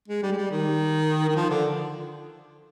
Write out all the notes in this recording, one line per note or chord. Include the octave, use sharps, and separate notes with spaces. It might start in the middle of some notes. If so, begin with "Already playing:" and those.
G#3
G3
G#3
G3
D#3
D#3
F3
D3